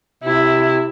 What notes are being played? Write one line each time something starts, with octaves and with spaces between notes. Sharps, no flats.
C3 E4